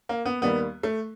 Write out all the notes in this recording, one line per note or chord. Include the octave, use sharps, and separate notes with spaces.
A#3
B3
D#2 D#3 G3 A#3 B3
A3